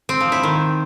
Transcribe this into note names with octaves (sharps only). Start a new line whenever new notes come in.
C4
F3
E4
D#3